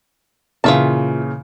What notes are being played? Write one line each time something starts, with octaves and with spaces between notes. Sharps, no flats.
A#2 C#3 E3 F4 E5 A5